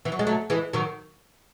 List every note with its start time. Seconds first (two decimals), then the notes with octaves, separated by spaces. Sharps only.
0.05 E3
0.12 F#3
0.19 G#3
0.27 F#3 A3
0.50 E3 G#3
0.73 D#3 F#3